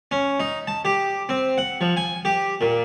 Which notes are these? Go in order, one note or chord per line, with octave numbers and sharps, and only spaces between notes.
C#4
D#4
A5
G4
C4
F#5
F3
G#5
G4
A#2